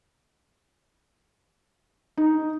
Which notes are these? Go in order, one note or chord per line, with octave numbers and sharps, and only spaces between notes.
D#4